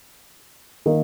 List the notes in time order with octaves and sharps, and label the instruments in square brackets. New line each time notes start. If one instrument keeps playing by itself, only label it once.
[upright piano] D#3 A#3